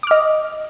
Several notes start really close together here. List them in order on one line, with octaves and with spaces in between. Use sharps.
D6 F6 D#5